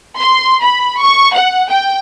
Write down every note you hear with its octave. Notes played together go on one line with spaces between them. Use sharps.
C6
B5
C#6
F#5
G5